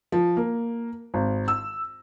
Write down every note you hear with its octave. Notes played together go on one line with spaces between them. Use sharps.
F3
A#3
G#1
E6